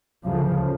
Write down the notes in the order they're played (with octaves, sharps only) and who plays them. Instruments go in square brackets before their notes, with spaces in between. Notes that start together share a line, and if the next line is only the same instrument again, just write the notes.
[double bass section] D2 C#3 F3